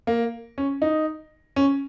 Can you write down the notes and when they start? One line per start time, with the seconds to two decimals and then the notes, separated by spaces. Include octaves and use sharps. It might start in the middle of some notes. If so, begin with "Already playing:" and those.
0.07 A#3
0.58 C#4
0.82 D#4
1.56 C#4